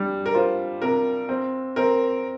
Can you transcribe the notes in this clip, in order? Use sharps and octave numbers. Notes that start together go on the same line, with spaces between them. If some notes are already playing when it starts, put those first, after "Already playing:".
Already playing: G3 D4
A#4
F4 C5
C3 A#4
C4
C4 A#4